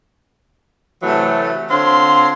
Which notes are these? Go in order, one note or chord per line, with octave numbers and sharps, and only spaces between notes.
C3 E3 F#3 A3
D3 C4 F4 C#5 C6